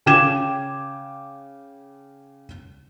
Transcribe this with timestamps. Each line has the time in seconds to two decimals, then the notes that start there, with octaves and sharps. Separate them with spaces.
0.06 C#3 G5 D6 G#6 E7